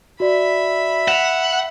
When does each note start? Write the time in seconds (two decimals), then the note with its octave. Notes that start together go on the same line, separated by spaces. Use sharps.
0.20 F#4 D5 E5 B5
1.08 F#5 E7 F7